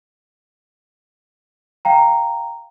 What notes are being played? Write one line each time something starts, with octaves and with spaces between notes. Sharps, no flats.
F5 G5 A#5